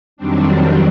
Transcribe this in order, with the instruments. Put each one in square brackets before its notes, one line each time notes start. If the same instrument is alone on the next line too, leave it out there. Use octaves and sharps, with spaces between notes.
[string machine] F2 D#3 F#3 G3 C4 D4